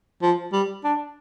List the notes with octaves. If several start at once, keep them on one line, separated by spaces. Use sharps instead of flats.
F3
G3
D4